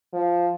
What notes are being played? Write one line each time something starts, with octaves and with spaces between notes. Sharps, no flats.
F3